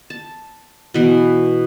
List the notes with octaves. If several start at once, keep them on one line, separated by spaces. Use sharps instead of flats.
A5
B2 E3